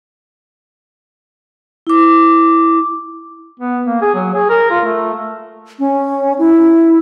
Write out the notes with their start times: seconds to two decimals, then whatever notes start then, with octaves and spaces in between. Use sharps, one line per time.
1.87 E4 D6
3.60 B3
3.86 A#3
4.02 G#4
4.15 F#3
4.34 G#4
4.49 A#4
4.71 F4
4.85 A3
5.79 C#4
6.39 E4